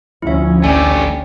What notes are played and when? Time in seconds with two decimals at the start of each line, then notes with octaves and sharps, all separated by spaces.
0.22 D2 F3 C#4 E4 E5
0.64 A1 A3 G4 D5 G#5